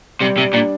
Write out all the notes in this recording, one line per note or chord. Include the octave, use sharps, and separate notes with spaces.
C3 G3
C3 G3
A#2 D4